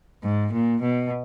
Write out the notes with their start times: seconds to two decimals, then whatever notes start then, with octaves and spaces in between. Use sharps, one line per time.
0.24 G#2
0.53 A#2
0.82 B2